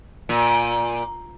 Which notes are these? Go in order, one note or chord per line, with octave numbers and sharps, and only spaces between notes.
A#2